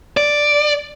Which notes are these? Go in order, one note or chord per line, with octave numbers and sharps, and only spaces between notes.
D5